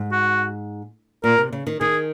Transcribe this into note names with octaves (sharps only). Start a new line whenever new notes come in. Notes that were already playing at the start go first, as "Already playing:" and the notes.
Already playing: G#2
F#4
A#2 A#4
C3
C#3
D#3
D#3 G#4